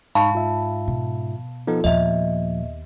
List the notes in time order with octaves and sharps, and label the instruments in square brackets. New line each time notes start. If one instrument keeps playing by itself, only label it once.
[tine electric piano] G#2 [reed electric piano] D#4 C#6 [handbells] F5 A5 B5
[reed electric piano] F4 E5
[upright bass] B2
[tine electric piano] F3 B3 D#4 [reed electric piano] F4 A4
[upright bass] D#2 B3 [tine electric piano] A#2 A#3 [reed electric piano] F3 [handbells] D#5 E5